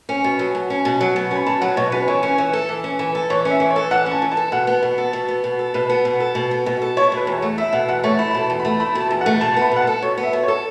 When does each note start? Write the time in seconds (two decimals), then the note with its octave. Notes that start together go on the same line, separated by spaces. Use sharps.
0.09 C#4
0.24 B2
0.39 F#3
0.55 B2
0.70 C#4
0.85 B2
1.01 F#3
1.16 B2
1.31 C#4 B5
1.47 B2 A5
1.61 F#3 F#5
1.77 B2 C#5
1.92 C#4 B4
2.08 E3 C#5
2.23 C#4
2.38 E3
2.53 A4
2.69 E3
2.84 C#4
2.99 E3
3.15 A4
3.30 E3 C#5
3.45 C#4 E5
3.60 E3
3.70 C#5
3.76 A4
3.91 E3 F#5
4.06 C#4
4.11 A5
4.22 E3
4.32 A5
4.37 A4
4.52 B2 F#5
4.67 B3
4.83 B2
4.98 A4
5.13 B2
5.28 B3
5.44 B2
5.59 A4
5.74 B2 B4
5.90 B3
6.05 B2
6.20 A4
6.35 B2
6.51 B3
6.66 B2
6.82 A4
6.97 E4 C#5
7.12 B2 B4
7.27 E2
7.38 C#5
7.42 A3
7.58 E4 E5
7.73 B2 F#5
7.89 E2 F#5
8.04 A3 C#5
8.19 E4 B5
8.31 B5
8.34 B2 A5
8.50 E2
8.60 B5
8.65 A3
8.80 E4 B5
8.95 B2
9.00 A5
9.11 E2
9.21 F#5
9.26 A3
9.41 B2 A5
9.54 B3 A5
9.62 B5
9.72 B2 F#5
9.82 A5
9.87 A4
10.02 B2 C#5
10.18 B3
10.23 E5
10.33 B2
10.43 C#5
10.48 A4